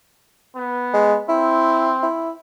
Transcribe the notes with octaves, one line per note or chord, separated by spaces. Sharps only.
B3
G#3
C4 E4
E4